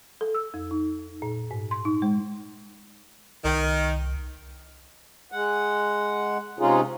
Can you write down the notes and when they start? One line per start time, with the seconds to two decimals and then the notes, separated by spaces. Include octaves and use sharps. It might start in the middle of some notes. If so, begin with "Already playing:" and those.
0.21 A4
0.35 E6
0.54 F2
0.71 D#4
1.22 A#2
1.51 G#2
1.71 C6
1.85 D#4
2.02 G#3
3.45 C2 D#3
5.32 G#3 F#5
6.59 C3 G#3 C#4 D#4 F4 G#4